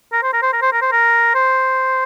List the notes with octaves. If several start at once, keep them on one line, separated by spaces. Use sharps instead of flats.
A#4
C5
A#4
C5
A#4
C5
A#4
C5
A#4
C5